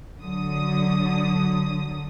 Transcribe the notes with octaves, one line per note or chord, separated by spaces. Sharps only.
D3 F#3 D#6